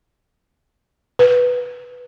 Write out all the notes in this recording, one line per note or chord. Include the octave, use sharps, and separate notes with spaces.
B4